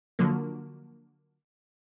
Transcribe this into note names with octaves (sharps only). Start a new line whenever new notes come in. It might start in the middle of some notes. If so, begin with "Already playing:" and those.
D3 F3 F#3 A#3